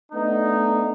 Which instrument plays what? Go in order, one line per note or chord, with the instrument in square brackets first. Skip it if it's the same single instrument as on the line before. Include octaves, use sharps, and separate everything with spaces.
[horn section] A3 B3 D4 D#4